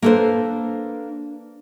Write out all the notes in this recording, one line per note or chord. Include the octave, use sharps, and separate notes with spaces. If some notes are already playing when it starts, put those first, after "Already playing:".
A#3 D4 A4 B4 C5